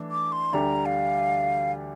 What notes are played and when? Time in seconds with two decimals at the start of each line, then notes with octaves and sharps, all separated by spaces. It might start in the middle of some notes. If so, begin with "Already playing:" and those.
Already playing: E3 A3 D4
0.11 D6
0.32 C6
0.53 D2 D3 G3 D4 A#5
0.86 F5